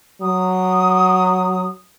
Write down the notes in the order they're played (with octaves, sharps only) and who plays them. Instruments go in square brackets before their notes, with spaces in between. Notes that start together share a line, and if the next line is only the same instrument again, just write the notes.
[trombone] F#3 [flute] D#6